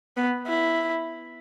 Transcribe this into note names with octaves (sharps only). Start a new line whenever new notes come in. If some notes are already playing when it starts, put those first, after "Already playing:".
B3
E4